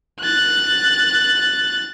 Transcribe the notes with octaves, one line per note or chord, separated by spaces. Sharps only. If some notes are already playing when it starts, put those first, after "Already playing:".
F#6 A6